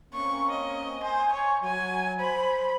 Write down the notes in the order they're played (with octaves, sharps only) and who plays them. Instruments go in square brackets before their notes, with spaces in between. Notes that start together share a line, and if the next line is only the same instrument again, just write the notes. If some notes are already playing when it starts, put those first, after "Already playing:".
[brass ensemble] A#3 C4 C#4 [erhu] C#6
[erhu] D#5
[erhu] C5 [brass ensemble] G#5
[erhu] C#5
[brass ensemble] F#3 [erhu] G#5
[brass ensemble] C5 [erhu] B5